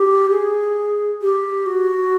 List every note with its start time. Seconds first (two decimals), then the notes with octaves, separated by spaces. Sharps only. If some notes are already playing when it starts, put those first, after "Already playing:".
Already playing: G4
0.30 G#4
1.22 G4
1.66 F#4